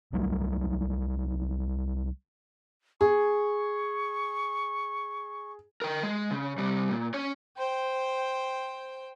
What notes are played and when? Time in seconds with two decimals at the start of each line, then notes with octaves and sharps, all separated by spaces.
0.13 C2 F#3 G3 A3
3.01 G#4 C#6
5.82 A#4 G5
6.03 G#3
6.31 C#3
6.58 C3 G3
6.91 A#2
7.14 C#4 C#5
7.57 C5 G5